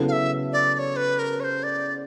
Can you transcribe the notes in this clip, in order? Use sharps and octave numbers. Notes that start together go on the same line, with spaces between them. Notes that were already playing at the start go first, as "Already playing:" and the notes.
Already playing: C#3 F#3 B3 E4 A4
F5
E5
D5
D5
C#5
B4
A#4
C#5
C5
D5